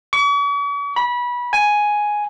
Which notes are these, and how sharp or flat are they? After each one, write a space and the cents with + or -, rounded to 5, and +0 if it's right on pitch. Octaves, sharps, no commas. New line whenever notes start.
C#6 +45
B5 -25
G#5 +5